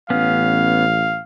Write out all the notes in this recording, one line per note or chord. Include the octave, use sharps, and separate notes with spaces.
A1 B3 C#4 F5